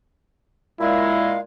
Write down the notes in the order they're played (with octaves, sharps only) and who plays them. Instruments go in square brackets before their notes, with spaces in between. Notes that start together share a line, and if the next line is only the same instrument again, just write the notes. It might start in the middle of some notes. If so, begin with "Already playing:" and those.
[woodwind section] A#2 G#3 [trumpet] E4 [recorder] F5